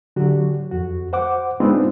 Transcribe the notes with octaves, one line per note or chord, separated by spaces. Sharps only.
D3 F#3 F#4 G4
F2 F#4
C5 F#5 D6
G#3 B3 C4 D4 D#4 F4